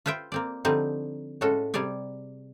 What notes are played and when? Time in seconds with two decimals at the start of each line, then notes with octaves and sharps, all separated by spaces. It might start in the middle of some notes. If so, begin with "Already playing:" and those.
0.06 F4 B4 C5 E5 G5
0.32 A#3 C4 D5
0.65 D3 F3 G3 C4 D#4
1.41 A2 G#3 C#4 F#4 A4
1.74 C3 G3 G#4 D5 G#5